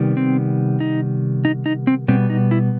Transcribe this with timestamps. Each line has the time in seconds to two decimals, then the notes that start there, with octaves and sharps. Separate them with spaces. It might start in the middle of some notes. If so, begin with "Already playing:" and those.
Already playing: C3 D#3 G3 B3
0.17 C4
0.80 D#4
1.45 D#4
1.66 D#4
1.87 C4
2.08 B2 G3 B3 C4
2.30 D#4
2.51 E4